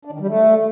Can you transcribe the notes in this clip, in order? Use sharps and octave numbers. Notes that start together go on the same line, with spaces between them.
D4
D#3
G3
A3